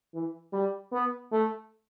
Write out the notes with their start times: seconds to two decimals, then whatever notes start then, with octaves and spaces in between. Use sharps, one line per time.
0.14 E3
0.53 G3
0.92 B3
1.31 A3